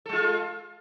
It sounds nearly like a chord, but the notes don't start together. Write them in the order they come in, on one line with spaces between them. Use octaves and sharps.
A4 G#3 F4